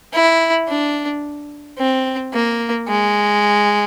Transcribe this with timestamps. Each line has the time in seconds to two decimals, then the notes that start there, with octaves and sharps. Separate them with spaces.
0.13 E4
0.68 D4
1.78 C4
2.33 A#3
2.88 G#3